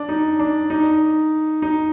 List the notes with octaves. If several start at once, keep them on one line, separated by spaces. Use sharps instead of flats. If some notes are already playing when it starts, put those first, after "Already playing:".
Already playing: D4
D#4
D4
D#4
D#4